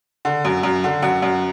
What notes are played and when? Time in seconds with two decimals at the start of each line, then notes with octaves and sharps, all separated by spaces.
0.25 D3
0.45 F#2
0.63 F#2
0.84 D3
1.02 F#2 F#5
1.22 F#2